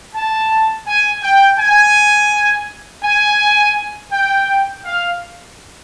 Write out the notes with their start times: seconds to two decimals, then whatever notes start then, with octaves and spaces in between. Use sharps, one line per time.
0.14 A5
0.87 G#5
1.23 G5
1.59 G#5
3.04 G#5
4.12 G5
4.85 F5